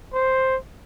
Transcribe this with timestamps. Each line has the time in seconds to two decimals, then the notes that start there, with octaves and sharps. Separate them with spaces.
0.14 C5